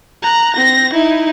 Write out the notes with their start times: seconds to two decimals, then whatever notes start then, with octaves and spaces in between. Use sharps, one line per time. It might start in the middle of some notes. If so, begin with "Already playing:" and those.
0.23 A#5 F#6
0.54 C4 A#6
0.93 D#4 E4